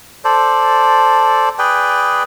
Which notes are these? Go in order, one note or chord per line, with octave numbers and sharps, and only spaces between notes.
A4 C5 D5
G#4 B4 D5 G5